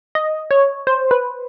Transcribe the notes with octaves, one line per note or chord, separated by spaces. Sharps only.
D#5
C#5
C5
B4